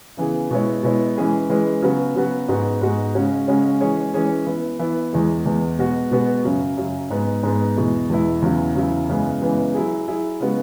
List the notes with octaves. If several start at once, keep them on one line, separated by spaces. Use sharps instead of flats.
C#3 E3 B3 G#4
B2 G#3 B3 E4 C#5
B2 G#3 B3 E4 C#5
E3 G#3 C#4 G#4 B4
E3 G#3 C#4 G#4 B4
C#3 F#3 B3 F#4 B4
C#3 F#3 B3 F#4 B4
G#2 G#3 B3 F#4
G#2 G#3 B3 F#4
C#3 G#3 C#4 F#4 C#5
C#3 G#3 C#4 F#4 C#5
E3 G#3 C#4 G#4 C#5
E3 G#3 C#4 G#4 C#5
E3 B3 E4
E3 B3 E4
E2 E3 G#3
E2 E3 G#3
B2 G#3 B3 F#4
B2 G#3 B3 F#4
F#2 C#3 F#3
F#2 C#3 F#3
G#2 G#3 B3
G#2 G#3 B3
E2 B2 G#3 E4
E2 B2 G#3 E4
E2 C#3 F#3 E4
E2 C#3 F#3 E4
F#2 C#3 E3 G#3 B3
F#2 C#3 E3 G#3 B3
F#3 E4 G#4
F#3 E4 G#4
C#3 G#3 B3 F#4